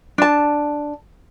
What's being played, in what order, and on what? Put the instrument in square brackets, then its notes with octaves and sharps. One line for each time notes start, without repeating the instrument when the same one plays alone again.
[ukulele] D4 A5